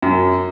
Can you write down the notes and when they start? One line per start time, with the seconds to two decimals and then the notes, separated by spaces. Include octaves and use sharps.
0.02 F#2